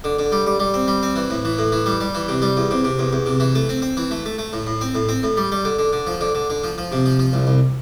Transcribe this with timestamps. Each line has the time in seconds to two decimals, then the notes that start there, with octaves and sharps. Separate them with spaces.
0.04 D3
0.19 D3
0.32 G3
0.46 G3
0.60 G3
0.74 C4
0.88 G3
1.03 C4
1.16 E3
1.30 A2
1.45 E3
1.58 A2
1.72 E3
1.86 G3
2.00 G3
2.15 E3
2.28 C3
2.42 G3
2.57 E2
2.71 C3
2.84 C3
2.99 E2
3.13 E2
3.26 C3
3.40 E3
3.55 A3
3.69 C4
3.82 C4
3.97 E3
4.11 A3
4.25 A3
4.38 A3
4.53 A2
4.66 A2
4.81 C4
4.95 A2
5.09 C4
5.23 A2
5.37 G3
5.52 G3
5.65 D3
5.79 D3
5.93 D3
6.07 F3
6.21 D3
6.35 D3
6.50 D3
6.64 F3
6.78 F3
6.92 C3
7.06 F3
7.19 F3
7.33 C2
7.47 C2